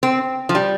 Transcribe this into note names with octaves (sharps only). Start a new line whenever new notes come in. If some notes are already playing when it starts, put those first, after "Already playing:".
C4
F3
G3